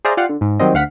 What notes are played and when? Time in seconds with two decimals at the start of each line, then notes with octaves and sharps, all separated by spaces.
0.05 G#4 C5 D5 E5 F5 A#5
0.17 F4 G4 D5 F5 F#5
0.29 D3
0.41 G#2
0.60 D#3 F#3 G3 C4 D#5
0.74 D2 F5 F#5 B6